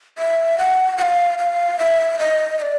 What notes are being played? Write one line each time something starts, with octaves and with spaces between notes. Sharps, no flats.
E5
F#5
F#5
F5
F5
E5
D#5
D#5
D5